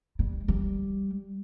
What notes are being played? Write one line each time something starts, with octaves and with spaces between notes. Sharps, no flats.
G3
G3